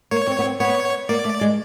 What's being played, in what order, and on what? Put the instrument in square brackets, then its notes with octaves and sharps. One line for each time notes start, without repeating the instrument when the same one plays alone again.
[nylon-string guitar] A#3 [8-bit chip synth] C#5
[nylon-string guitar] C4
B3
C4
[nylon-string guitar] B3 [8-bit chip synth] C#5
[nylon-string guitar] A#3 [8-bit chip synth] D5
[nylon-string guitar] A3
G#3